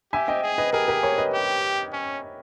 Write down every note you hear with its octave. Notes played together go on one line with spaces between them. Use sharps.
G4 E5 G#5
D#5 G5
G#4
B4 D#5
G4 G#4 A#4
G4 A#4
A#4 C#5
B4 D#5
G4
C#4